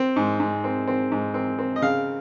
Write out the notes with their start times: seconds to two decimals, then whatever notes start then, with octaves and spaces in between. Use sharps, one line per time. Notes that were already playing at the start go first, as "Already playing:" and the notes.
Already playing: C4
0.16 G#2
0.40 G#2
0.64 C4
0.87 C4
1.12 G#2
1.34 C4
1.59 C4
1.76 D#5
1.82 C#3 F5